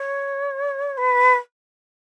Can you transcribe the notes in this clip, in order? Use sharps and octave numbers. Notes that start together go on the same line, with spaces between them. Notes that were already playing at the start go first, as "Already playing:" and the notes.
Already playing: C#5
B4